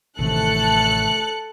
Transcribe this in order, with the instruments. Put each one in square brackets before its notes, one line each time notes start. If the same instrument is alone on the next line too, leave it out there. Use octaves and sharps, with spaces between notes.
[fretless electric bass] A1 C3 D#3 [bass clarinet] A3 [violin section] A4 F#6 C#7